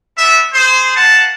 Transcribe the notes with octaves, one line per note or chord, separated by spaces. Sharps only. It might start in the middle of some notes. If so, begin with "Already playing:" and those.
B3 D4 E5
G#4 C5
A#3 F#5 A5